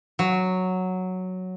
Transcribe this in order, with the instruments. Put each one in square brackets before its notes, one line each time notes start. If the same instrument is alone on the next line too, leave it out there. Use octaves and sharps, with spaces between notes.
[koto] F#3